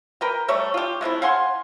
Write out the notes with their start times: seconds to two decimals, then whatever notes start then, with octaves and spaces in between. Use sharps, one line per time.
0.21 A#4 B4 G5
0.48 G3 A3 C#5 E5
0.74 F4 G4
1.01 G#3 A3 C4 E4
1.22 F5 F#5 G#5 C6